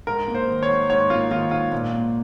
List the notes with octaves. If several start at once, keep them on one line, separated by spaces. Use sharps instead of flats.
G#2 A#4
A#3
C5
D#3
C#5
G#2
G#2 C#5
A#3 F4
D#3 F4
G#2 F4
A#2
A#3